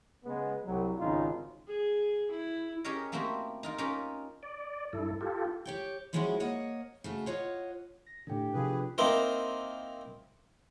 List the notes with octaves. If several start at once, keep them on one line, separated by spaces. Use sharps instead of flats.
C#3 G#3 B3
C2 F#3
G#1 C#3 D#4 F4
G#4
E4
C#4 G4 G#4 A#4 C#5 D#5
A3 A#3 C4 E4 F#4 G4
D#4 F4 A#4
C#4 D#4 F4 G4 A#4
D5
G2 E4 A4
F4 G4 A4
G4 C#5 G5
F3 G3 G#3 C#4 E4 F#4
A#3 C#5 D#5 F#5
C#3 A3 F#4
F4 C#5 D#5 F#5
A#6
A2 D3 D4 G4 A4 G5
E2 C3 F3 F4 G#4 B4
A#3 C4 D#4 E4 A#4 C5